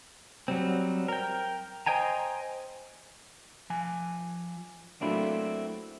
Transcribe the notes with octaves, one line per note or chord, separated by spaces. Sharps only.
F#3 G3 C4
A#4 G5
C5 D#5 G5 G#5 A#5
F3 G#5
F#3 A3 A#3 C4 D4 E4